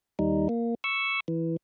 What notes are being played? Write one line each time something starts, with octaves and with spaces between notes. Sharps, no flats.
D#2 G3 D#4
A#3
C#6 E6
E3